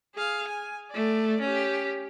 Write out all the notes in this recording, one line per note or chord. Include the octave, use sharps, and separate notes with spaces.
G#4 F5
G#5
A3 D5
C#4 G4